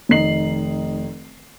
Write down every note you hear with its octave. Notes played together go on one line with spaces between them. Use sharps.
F1 D#3 D#5 A#5 C7 F#7